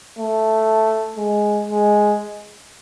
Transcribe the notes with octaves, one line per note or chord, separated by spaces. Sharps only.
A3
G#3
G#3